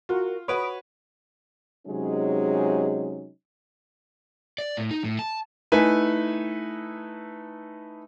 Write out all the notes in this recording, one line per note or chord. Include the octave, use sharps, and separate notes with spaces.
F4 F#4 A#4
F#4 B4 C#5 B5 D#6 D7
C3 F#3 G#3 C#4 D#4 G#4
D5
A2
D#4
A2
A5
A3 D#4 E4 B4 E5 G#5